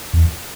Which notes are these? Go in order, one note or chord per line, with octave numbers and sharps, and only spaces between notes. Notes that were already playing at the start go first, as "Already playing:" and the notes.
E2